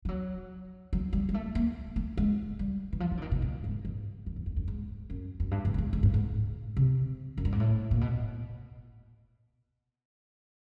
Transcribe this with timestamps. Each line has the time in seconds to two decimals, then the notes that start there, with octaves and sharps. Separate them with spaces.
0.05 F3
0.09 F#3
0.93 F#3
1.13 G3
1.29 G#3
1.34 A3
1.55 A#3
1.96 A3
2.17 G#3
2.59 G3
2.93 E3
3.00 F3
3.12 E3
3.17 D3
3.22 D#3
3.32 B2
3.42 A2
3.64 G#2
3.85 G2
4.26 F#2
4.36 E2
4.46 F2
4.57 F#2
4.68 G#2
5.10 F#2
5.40 F#2
5.51 G2
5.65 G#2
5.74 A2
5.78 G#2
5.93 G#2
6.03 G2
6.14 G#2
6.77 C3
7.37 F#2
7.45 G2
7.52 G#2
7.60 A2
7.91 A#2
8.01 B2